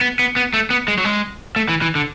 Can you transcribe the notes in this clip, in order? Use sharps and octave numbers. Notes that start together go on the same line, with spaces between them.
B3
B3
B3
A3
B3
G#3
F#3
G#3
A3
E3
E3
D3